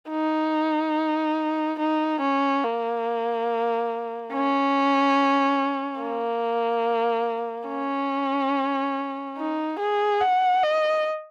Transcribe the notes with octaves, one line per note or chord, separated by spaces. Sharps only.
D#4
D#4
C#4
A#3
C#4
A#3
C#4
D#4
G#4
F#5
D#5